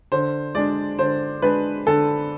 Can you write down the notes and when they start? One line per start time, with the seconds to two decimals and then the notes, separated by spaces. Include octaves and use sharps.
0.12 D3 C5
0.55 G#3 D4 D5
0.99 D3 C5
1.42 G#3 D4 B4
1.87 D3 A4